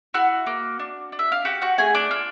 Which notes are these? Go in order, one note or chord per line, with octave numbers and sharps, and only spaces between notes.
E4 F#4 F#5
A#3
D4
D4
E5
F5
F#4 G4 F#5
F#4 F#5
A3 G#4 G#5
D4 D5
F4